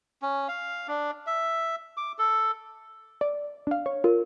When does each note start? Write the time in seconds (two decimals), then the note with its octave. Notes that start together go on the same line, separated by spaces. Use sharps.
0.22 C#4
0.48 F5
0.88 D4
1.26 E5
1.97 D6
2.18 A4
3.21 D5
3.67 D4 F5
3.86 C#5
4.04 F4 A#4